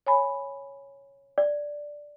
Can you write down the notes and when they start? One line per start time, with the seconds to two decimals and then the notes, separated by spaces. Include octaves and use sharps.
0.06 C#5 G#5 B5
1.38 D5